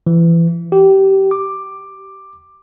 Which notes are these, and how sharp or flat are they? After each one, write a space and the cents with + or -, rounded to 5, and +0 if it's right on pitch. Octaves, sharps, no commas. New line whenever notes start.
E3 +25
G4 -20
D6 +10